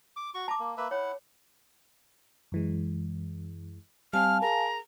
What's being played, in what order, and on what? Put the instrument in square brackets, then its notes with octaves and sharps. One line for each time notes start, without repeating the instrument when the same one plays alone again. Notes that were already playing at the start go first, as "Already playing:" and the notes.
[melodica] D6
F#4 C#6
[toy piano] A5 D6 [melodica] A#5
[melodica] A#3
A#3 B4 E5
[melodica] E4 F#5 [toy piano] C#5
[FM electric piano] F#2 E3 G#3
[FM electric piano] G3 C4 [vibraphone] F5 G#5 A5 [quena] F6
[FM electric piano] G#4 A#4 [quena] A#5